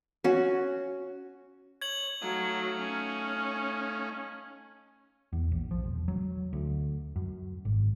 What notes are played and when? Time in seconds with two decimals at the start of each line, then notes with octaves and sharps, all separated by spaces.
0.24 C#4 F#4
1.82 C#5 G#6 F#7
2.22 F#3 A3 D#4 F5
2.77 C#4
5.33 E2
5.52 A#1
5.71 F3
5.84 E1
6.08 F#3
6.53 D2
7.16 F#2
7.65 G#1